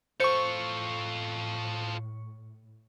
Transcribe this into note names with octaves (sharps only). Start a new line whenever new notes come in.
A2 F4 A4 C5 C#6 C#7